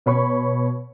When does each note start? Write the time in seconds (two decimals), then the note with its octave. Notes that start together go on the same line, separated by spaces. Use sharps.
0.06 B2 C#5 B5 C#6